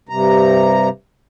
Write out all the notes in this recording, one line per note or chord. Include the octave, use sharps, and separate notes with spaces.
G2 C3 A#5